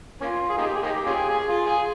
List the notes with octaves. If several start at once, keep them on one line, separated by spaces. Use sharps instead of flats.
A#3 C#4 F4
G#4
A#3 D#4 G4
G#4
A#3 D#4 G4
C#4 F4 G#4
G#4
F4
G#4